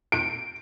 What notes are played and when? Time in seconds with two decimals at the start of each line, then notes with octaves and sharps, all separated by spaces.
0.12 D7